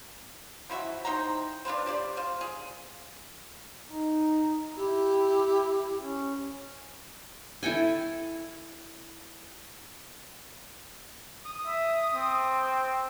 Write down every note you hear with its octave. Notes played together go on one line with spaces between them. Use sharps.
F3 E4 F#4 E5
D#4 C5 G5 A#5
D4 F4 B4 C5
G4 C5 D5
F4 C5
G#4
D#4
E4 G4
C#4
E4 A4 G5 G#5
D#6
E5
C4